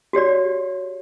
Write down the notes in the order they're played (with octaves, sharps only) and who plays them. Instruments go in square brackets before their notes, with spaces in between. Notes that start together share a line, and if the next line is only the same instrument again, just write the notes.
[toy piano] F#4 G4 C#5 D5